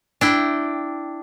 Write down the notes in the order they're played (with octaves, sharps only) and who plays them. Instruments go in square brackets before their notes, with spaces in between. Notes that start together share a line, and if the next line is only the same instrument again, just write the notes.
[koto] D4 E4 G5